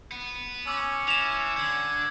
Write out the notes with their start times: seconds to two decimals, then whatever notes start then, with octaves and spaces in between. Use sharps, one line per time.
0.12 B3
0.67 C#4 D6 E6
1.08 E3 E7 F7
1.57 D3 E6 G#6